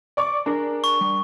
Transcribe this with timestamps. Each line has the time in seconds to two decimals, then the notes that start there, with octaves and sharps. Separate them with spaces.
0.17 D5 C#6 D6
0.46 D4 G#4 A#4
0.84 C#6
1.01 G3